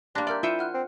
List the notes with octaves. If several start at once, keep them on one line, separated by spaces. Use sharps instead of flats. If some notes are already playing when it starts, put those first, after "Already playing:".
G3 A#3 D4 C6 F#6 A#6
A#4 D5 E5 C6 F6 G6
E4 F4 C5 E5 G5 G6 C#7 D#7
F#5 F6 F#6
C4